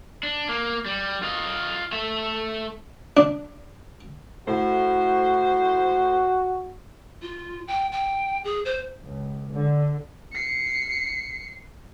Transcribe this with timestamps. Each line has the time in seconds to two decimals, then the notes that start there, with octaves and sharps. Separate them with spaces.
0.23 D4
0.49 A#3
0.86 G3
1.23 F4 D#5
1.92 A3 E5
3.17 D4
4.47 A2 F#4 C5
7.22 F4
7.68 G5
7.92 G5
8.45 G#4
8.65 C5
9.04 C#2
9.52 D3
10.32 C7 C#7